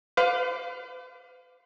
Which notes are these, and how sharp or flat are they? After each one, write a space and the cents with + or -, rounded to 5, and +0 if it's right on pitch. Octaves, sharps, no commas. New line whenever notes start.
B4 +45 F5 +15 D6 +0